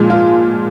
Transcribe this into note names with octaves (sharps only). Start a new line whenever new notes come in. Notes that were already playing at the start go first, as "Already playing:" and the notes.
Already playing: A#2 F3 G#3
F4